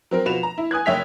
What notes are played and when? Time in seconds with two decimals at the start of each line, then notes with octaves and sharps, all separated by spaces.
0.11 F#3 C4 A#4
0.26 B2 F3 F#4 B4 E7 F7
0.43 A#5
0.58 E4
0.71 G#5 D#6 F#6 G#6
0.85 F#1 C#5 E5 G5 B6 F7